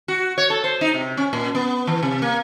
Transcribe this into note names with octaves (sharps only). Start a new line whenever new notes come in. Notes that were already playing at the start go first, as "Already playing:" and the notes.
F#4
C#5
A4
C5
D#4
C3
C#4
A#2
B3
E3
C3
A#3